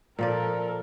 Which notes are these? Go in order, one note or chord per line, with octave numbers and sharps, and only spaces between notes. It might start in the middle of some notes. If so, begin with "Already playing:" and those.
A#2 F3 A4 A#4 D5